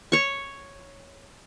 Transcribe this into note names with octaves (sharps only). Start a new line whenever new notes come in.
C#5 C#6